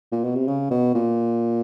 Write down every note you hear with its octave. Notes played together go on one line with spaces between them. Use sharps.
A#2
B2
C3
C#3
B2
A#2